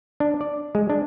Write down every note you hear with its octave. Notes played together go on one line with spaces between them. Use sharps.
D4
D5
G#3
D4